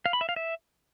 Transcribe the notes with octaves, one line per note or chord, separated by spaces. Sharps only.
F5
B5
E5
F5
E5